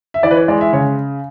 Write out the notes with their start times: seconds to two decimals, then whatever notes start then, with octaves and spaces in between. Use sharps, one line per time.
0.14 E5
0.23 E3 D5
0.31 B4
0.36 C#5
0.48 G#3 D5
0.61 E5
0.73 C#3 C#5